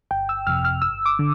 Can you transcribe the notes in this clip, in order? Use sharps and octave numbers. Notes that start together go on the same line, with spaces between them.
G1 G5
E6
F2 C3 F6
F6
G1 E6
D6
D3